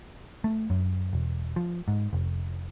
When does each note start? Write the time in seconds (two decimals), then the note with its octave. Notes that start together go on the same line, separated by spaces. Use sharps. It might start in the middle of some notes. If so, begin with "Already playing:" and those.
0.44 A3
0.70 F#2
1.13 E1
1.56 F3
1.88 G#2
2.13 F1